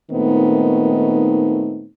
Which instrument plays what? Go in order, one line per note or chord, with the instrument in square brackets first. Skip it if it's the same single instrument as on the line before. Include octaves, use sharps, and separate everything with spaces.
[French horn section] A#2 D#3 A3 B3 C4 D#4